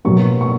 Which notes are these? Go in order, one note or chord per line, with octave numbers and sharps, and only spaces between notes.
B2 F#3 A#3 C#6
C#6